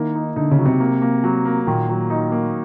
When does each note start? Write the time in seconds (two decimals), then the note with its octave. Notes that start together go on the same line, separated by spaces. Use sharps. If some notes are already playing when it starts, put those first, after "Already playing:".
Already playing: D#3 A#3 E4
0.15 D#4
0.36 D3 D#4
0.51 C#3
0.59 F#3
0.66 C3
0.80 A#3
1.02 A#3
1.24 F#3
1.45 A#3
1.67 A#2 D#3
1.89 F#3
2.10 D#4
2.32 A#3